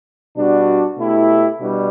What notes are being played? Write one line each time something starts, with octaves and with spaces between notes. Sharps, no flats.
B2 G3 D4 F#4
B2 A3 E4 G4
B2 G3 D4